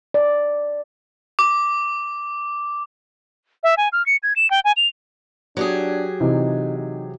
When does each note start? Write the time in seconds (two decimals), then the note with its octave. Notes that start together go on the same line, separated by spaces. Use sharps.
0.14 D5
1.39 D6
3.63 E5
3.77 G#5
3.92 F6
4.06 C#7
4.23 G#6
4.36 E7
4.50 G5
4.64 G#5
4.76 F7
5.57 F#3 D4 G4 G#4
6.20 C3 E3 D#4
6.78 D#4